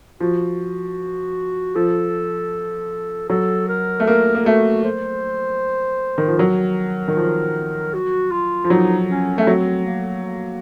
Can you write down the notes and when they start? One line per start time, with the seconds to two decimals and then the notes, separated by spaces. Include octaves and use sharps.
0.20 F3 F#4
1.75 F3 A4
3.30 F#3 A4
3.69 A#4
4.00 A3
4.07 A#3 A#4
4.35 A#3
4.46 A3 F#4
4.84 C5
6.18 D#3
6.28 F3
6.39 F#3 A#4
7.08 D#3
7.16 F3
7.94 F#4
8.32 F4
8.64 F3
8.70 F#3 D#4
9.09 C#4
9.38 A3 C#4
9.47 F#3 C4
9.86 A#3
10.25 A#3